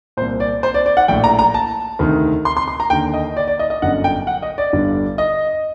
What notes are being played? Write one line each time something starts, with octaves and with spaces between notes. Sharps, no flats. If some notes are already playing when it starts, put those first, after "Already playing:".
C2 A#2 C5
D5
C5
D5
D5
F#5
A#1 A2 G5
A#5
A#5
A5
D2 C3 D#3
C6
C6
C6
A#5
D#2 D3 G5
D#5
D5
D5
D#5
D#5
G1 F#2 D3 F#5
G5
F#5
D#5
D5
G1 G2 D3
D#5